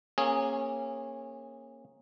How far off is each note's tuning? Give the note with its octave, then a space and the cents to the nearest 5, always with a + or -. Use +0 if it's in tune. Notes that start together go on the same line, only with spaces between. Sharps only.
A#3 +0 C#4 -25 G#4 +0